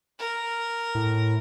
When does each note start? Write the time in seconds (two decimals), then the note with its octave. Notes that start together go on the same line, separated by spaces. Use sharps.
0.19 A#4
0.95 A2